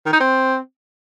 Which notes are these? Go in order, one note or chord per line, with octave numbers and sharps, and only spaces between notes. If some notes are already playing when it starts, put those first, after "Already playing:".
D#3
D#4
C4